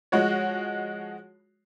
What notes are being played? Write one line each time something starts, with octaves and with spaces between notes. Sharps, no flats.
F3 G#3 F#4 C#5